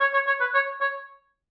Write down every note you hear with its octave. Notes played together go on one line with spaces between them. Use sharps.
C#5
C#5
C#5
B4
C#5
C#5